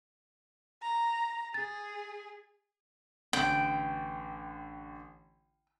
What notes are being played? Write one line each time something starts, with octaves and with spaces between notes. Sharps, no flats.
A#5
G#4 A6
A1 D3 G5 F#7